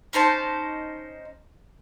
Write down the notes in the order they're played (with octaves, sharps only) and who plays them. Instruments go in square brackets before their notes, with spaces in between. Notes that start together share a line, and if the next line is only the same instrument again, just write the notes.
[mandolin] C#4 D#4 C5 A5